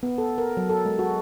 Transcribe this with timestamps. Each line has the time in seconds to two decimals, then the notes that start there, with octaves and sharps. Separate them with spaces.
0.03 B3
0.18 A4
0.38 A#4
0.57 F#3
0.70 A4
0.85 G#3
0.99 F#4